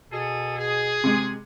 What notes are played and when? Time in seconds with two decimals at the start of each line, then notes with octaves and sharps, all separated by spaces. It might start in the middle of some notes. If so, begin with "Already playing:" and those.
0.11 B2 G#4 A4
0.58 G#4
1.04 C3 G#3